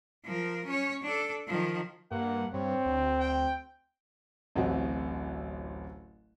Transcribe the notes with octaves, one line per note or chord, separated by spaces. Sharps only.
F3 A#4
C#4 C#5
D4 A4
D#3 F3
G2 A#3 F#5
G2 C4 C#5
D2
G5
D1 A1 C3 F#4 D#5